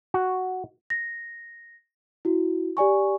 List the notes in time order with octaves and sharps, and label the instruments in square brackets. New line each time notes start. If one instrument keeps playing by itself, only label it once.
[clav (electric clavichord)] F#4
[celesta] A#6
E4 F#4
G4 D5 G#5 C#6